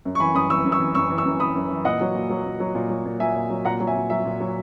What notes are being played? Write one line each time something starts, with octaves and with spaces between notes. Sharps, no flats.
F#2
C#6
E3 G#5 B5
F#2 B5 D#6
E3 C#6 E6
F#2
C#6 E6
E3
F#2 C#6 E6
E3
C#6 E6
F#2
E3 B5 D#6
F#2
E3
A#2 D#5 F#5
F#3
A#2
F#3
A#2
F#3
A#2
F#3
A#2
F#3 E5 G#5
A#2
F#3
A#2 F#5 A#5
F#3
E5 G#5
A#2
F#3 E5
A#2
F#3